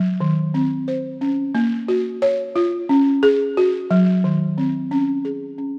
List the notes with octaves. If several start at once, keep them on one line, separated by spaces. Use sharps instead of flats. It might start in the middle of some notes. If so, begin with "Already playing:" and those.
Already playing: F#3
D#3
C4
C5
C#4
A#3
F#4
C#5
F4
C#4
G#4
F#4
F#3
D#3
C4
C#4
G#4
C#4